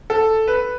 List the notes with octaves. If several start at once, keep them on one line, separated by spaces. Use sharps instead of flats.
A4
B4